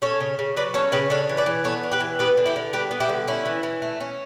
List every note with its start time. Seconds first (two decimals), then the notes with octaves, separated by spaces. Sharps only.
0.02 C#4 A4 C#5
0.20 C#3
0.39 C#3
0.56 F#3 B4 D5
0.74 C#4 A4 C#5
0.92 C#3 G4 B4
1.10 D4 A4 C#5
1.29 E3
1.37 B4 D5
1.46 E3
1.64 B3 A4 C#5
1.83 D4
1.91 G4 B4
2.00 E3
2.19 B3 G4 B4
2.37 D3
2.46 E4 G4
2.56 D3
2.73 G3 G4 B4
2.91 B3
3.00 E4 G4
3.09 D3
3.28 C#4 E4
3.45 E3
3.63 E3
3.82 A3
4.00 C#4